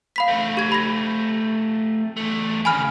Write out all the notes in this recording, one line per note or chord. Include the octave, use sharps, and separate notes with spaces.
F5 B5 B6
A3 C4
G4 G#6
B5 A#6
E2 A3
D#2 C#3 G#5 B5 F6